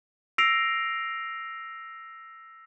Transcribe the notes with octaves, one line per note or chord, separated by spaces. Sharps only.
E6 A#6 C7 D7 F7